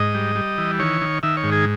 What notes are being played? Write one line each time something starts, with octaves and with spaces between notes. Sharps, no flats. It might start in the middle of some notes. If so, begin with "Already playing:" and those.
Already playing: G#2 D#5
G3
G3
E3
D#3 C#5
D#3
D#3 E5
C#5
G#2
G#4